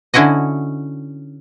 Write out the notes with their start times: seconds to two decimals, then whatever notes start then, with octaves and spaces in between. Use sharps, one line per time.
0.14 D3 C#4 E4 F#4 D#5